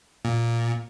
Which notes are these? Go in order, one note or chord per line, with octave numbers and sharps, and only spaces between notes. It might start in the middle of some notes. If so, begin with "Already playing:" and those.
A#2